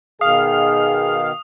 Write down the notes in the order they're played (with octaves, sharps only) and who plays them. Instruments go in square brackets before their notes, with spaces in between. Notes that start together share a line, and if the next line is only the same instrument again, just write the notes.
[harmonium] B2 D#3 [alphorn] G#4 [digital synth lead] F5 [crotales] D#6